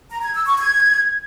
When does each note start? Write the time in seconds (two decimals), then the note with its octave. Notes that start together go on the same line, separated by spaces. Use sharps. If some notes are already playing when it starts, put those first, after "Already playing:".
0.10 A#5
0.22 G#6
0.34 E6
0.46 C#6
0.58 G#6